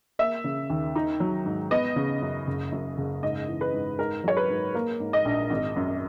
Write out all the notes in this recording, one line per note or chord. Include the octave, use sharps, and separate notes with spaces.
A#3 E5
C#3
D#2
D#4
F#3
G#2
B3 D#5
C#3
F#2
F#1
F#2
F#1
G#2 D#5
E3
B4
G#2
G#2 A#4
F#3 C#5
B4
G#2
A#3
G#2
D#5
A#1
G#1
F#2